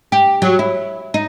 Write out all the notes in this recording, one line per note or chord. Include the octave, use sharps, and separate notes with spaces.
G4
F#3
E4
D#4